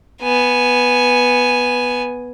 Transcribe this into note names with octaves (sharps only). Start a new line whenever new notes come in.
B3 G#5